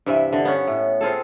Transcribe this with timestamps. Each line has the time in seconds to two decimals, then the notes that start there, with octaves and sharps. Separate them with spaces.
0.06 G2 C3 E3 E5
0.33 D3
0.45 B3 C#4
0.67 A2
1.01 C4 F4 G#4 A4